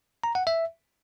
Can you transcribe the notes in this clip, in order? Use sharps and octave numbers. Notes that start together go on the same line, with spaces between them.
A#5
F#5
E5